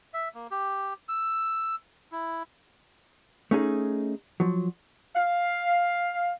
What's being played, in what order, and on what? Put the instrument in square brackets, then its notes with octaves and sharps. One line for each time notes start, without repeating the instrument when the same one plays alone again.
[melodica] E5
A#3
G4
E6
E4
[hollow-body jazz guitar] A3 C#4 D#4 G#4
F3 F#3
[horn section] F5